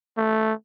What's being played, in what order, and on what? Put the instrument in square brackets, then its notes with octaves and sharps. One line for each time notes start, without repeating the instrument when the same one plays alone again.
[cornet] A3